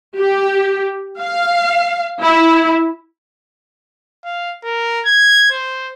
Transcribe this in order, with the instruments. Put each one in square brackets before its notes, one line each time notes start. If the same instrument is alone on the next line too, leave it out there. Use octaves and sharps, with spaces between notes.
[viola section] G4
F5
E4
[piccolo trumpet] F5
A#4
G#6
C5